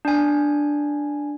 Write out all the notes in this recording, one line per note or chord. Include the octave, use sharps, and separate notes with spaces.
D4 G#5